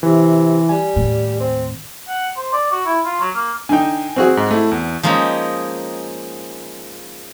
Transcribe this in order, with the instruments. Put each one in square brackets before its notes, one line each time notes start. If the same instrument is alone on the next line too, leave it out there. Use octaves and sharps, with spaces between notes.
[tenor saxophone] C3 [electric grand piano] E3
[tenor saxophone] G3 [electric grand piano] G#5
[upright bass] D#2 A2
[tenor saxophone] C4
[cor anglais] F#5
C5
D5
F#4
E4
F4
F#3
A#3
[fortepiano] D3 D#4 [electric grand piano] G5 G#5
[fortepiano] C4 F#4 G#4
[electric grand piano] G#2
A3 E4
E2
[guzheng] F3 G#3 A#3 C#4 D#4